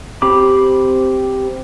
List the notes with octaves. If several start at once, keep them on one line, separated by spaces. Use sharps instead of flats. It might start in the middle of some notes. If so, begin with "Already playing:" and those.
C4 G4 B5 D6